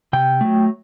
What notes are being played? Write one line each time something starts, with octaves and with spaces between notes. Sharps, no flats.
C3 G5
F#3 A3